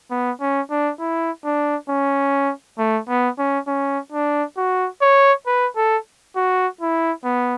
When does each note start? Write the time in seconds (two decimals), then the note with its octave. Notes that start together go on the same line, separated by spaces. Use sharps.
0.11 B3
0.41 C#4
0.70 D4
1.00 E4
1.45 D4
1.89 C#4
2.78 A3
3.09 B3
3.39 C#4
3.67 C#4
4.12 D4
4.57 F#4
5.02 C#5
5.47 B4
5.76 A4
6.36 F#4
6.81 E4
7.25 B3